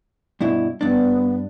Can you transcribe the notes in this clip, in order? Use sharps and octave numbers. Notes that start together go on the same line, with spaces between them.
G2 B2 E4
G2 B3 D4